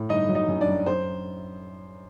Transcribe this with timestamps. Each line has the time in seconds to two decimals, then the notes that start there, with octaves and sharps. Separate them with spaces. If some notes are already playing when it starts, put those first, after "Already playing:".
Already playing: A2
0.09 G1 D#4 D#5
0.29 F#3
0.35 D#4 D#5
0.48 F#2
0.61 D4 D5
0.68 F#2
0.86 C5